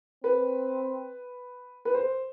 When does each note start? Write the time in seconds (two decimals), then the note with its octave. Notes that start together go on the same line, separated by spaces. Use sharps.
0.24 C4 B4
1.85 B4
1.94 C5